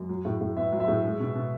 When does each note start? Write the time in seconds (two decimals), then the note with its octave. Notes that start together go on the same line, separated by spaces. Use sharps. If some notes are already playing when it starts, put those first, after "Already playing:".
Already playing: F#2
0.09 F#3
0.25 A2
0.41 A2
0.57 B3 E5
0.72 F#3
0.80 E5
0.88 A2
1.04 G#3
1.20 B2
1.35 B2